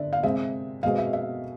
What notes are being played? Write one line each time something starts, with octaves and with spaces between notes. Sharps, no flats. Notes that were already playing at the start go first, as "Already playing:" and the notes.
Already playing: D3 D5 E5
F5
C3 G#3 C4 E5
B2 G#3 C4 F5
E5
E5